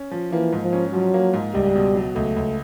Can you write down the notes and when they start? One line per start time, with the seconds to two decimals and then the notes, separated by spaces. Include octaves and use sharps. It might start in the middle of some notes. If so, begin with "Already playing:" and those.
Already playing: C#4
0.11 F3
0.31 E3 A#3
0.52 G#2
0.62 F3
0.73 C#4
0.93 F3 F#3
1.14 A#3
1.33 G#2
1.54 C#2 G3
1.75 B2
1.96 F#3
2.15 C#2 A3
2.36 C#2